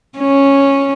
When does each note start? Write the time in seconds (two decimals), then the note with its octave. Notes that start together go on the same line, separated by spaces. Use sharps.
0.19 C#4